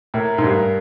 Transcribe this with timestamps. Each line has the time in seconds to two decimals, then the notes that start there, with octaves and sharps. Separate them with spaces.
0.14 A2 A#4
0.38 G#2
0.44 G2